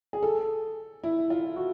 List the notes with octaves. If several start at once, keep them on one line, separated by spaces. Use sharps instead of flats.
G#4
A4
E4
F4
F#4